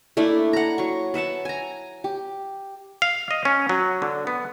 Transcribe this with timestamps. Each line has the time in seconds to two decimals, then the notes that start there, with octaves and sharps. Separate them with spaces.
0.17 A3 A#3 D4 E4
0.53 F#5 A#5
0.78 F#3 C#6
1.14 B4 E5 F#5 A5
1.45 G#5 A#5
2.04 G4
3.02 F5
3.31 D#5
3.45 C#4
3.69 F#3
4.02 D3
4.27 B3